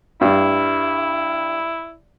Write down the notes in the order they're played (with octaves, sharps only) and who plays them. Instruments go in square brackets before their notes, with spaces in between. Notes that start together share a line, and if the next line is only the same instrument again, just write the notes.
[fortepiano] G2 [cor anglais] E4